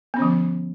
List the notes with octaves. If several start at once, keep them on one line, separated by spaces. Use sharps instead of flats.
D3 F3 B3 C#4